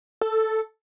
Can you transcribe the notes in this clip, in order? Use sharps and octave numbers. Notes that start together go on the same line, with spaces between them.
A4